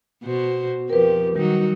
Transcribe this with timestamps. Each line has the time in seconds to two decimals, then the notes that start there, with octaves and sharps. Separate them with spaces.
0.24 B2 F#4 C5
0.90 F2 F3 G4 A#4 B4
1.36 D#3 F#3 G3 D#4 F#4